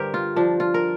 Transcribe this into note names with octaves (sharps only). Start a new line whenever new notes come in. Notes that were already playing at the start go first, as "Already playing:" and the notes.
Already playing: G2 D3 G4 A#4 C5
F4
F3 D4
F4
A#4